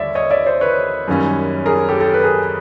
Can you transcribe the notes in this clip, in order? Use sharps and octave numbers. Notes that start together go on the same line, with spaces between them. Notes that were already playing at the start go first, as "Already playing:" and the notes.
Already playing: D#2 D3 G3 C#5 D5 E5
C#5 D#5
D5 E5
C5 D5
B4 C#5
F#2 D#3 G3 A#3 C#4
G#4 A#4
G4 A4
G4 A4
B4
G#4 A#4